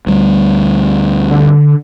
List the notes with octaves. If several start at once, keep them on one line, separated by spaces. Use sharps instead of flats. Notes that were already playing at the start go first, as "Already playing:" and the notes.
D2 G3
D3